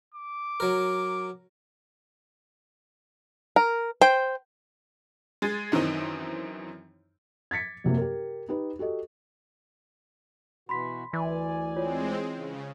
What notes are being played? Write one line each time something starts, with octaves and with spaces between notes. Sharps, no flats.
D6
F#3 A#4
A#4
C5 G5
G#3 G#4 A6
F#2 D#3 E3 C4 D#4
G#6 A6 B6 C#7
F#2 C3 F#3 A#3
G4 A#4
D#4 G4 B4
F#4 G4 A4 D#5
B2 E3 F#4 B5 C6 B6
D2 E3 D5 G#5
G#3 C4 F4 C#5
C#3